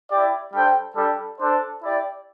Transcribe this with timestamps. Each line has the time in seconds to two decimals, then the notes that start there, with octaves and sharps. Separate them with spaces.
0.11 E4 G4 D5
0.53 G3 D4 A4 C5 G5
0.96 G3 D4 A4
1.40 D4 A4 C5
1.83 E4 G4 D5